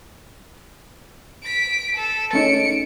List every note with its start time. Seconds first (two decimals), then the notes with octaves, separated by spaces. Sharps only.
1.43 B6 D7
1.95 A4
2.33 A3 C#4 D#4 C#7 D7